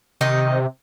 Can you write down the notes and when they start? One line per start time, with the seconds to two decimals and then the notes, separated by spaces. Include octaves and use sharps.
0.21 C3 D#3 D#4 D#5